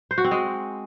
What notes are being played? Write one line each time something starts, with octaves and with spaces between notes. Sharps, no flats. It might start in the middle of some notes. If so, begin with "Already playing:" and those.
C5
F#4
C4
G#3